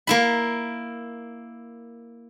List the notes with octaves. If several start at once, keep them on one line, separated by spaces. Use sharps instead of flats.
A#3 E4 B5